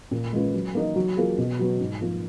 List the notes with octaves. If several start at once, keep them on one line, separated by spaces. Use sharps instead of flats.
A#2
G#3 C#4 F4 B4
F#3
A#3 D#4 A#4 D#5
F#3
A#3 F4 G#4
B2
F#3 B3 F#4
G#2
F3 A#3 F4 A#4